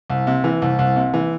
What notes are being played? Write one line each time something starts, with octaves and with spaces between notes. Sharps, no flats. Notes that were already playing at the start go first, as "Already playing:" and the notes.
C2
C3
E3
C2
C2
C3
E3